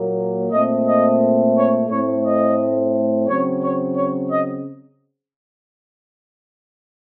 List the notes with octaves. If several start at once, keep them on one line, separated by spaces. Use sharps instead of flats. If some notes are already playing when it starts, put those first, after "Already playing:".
Already playing: A#2 F#3 A#3
A#2 A3 C4 D#5
D#5
C#5
A2 A3 C4 C#5
D#5
C#3 F#3 C4 C#5
C#5
C#5
D#5